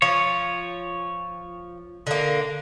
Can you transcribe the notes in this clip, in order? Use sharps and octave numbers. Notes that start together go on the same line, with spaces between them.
F3 C#5
D3 A#3